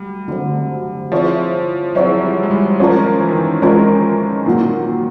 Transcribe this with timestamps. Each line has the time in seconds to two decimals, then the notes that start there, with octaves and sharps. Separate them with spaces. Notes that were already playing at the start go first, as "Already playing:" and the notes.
Already playing: F#3 G3 A3
0.28 D3 F#3 A3 C4
1.12 F3 C4 E4 G#4 C#5 E5
1.95 F#3 C4 E4 G#4 C#5 E5
2.23 G3
2.43 G#3
2.51 G3
2.79 F3 G#3 C#4 F4 A#4
3.20 E3
3.29 D#3
3.37 E3
3.62 E3 G#3 C#4 F4 A#4
4.45 A#2 D#3 F#3 A#3